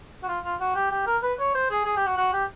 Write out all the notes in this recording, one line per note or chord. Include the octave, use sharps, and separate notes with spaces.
F#4
F4
F4
F#4
G4
G4
A#4
B4
C#5
C5
G#4
G#4
G4
F#4
F#4
G4